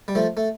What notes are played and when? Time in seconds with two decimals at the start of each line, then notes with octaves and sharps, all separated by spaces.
0.08 G3
0.15 F3 A3
0.37 A3